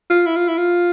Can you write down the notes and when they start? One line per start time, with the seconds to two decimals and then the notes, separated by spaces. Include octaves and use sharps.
0.10 F4
0.26 E4
0.36 F4
0.48 E4
0.58 F4